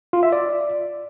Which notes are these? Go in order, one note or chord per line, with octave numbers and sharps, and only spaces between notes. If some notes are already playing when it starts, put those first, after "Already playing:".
F4
E5
D5